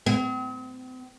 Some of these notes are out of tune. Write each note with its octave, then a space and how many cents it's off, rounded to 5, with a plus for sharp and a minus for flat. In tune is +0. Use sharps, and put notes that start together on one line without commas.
C4 -40